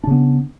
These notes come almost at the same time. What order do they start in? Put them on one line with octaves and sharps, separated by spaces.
D4 C#3 B3